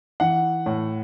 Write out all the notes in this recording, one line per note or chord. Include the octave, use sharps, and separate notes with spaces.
E3 F#5
A2